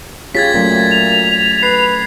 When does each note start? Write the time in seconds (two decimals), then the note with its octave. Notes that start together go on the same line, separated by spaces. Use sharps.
0.35 C#3 F4 G4 G#6 A6 B6
0.54 A#2 F#3 A3 C#4
0.91 F7
1.63 B4 C7